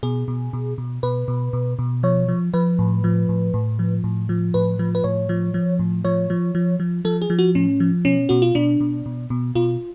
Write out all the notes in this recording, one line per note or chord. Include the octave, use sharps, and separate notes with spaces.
B2 G#4
B2
B2
B2
B2 B4
B2
B2
B2
F3 C#5
F3
F3 B4
A2
F3
A2
A2
F3
A2
F3
A2 B4
F3
B4
A2 C#5
F3
F3
A2
F3 C#5
F3
F3
F3
F3 A4
G#4
F3
F#4
A2 C#4
F3
B2 C#4
B2 F#4
F4
B2 D4
B2
B2
B2
B2 F4